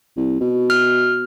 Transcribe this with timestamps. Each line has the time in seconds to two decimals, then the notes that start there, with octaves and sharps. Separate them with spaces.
0.16 C2
0.41 B2
0.70 F6